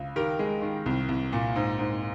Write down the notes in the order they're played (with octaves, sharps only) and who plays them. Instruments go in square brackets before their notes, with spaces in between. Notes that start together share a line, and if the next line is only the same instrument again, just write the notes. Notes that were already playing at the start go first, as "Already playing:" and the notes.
Already playing: [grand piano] C#2
D#3 G4 A#4
G#3
D#3
C2
C2
A#2
G#2
G#2